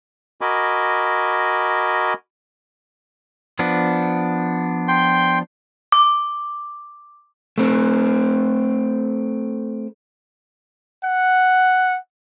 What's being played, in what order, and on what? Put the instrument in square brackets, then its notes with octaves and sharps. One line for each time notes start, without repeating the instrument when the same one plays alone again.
[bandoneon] F#4 A#4 D#5 G#5 B5 D6
[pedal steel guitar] F3 B3 D4
[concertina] G5 C6
[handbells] D6
[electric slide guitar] A3 C4
[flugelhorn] F#5